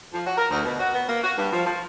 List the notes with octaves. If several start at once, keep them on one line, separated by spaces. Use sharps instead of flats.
F3
F#4
A#4
D2
B2
F#4
B3
A#3
F#4
G2
F3
F3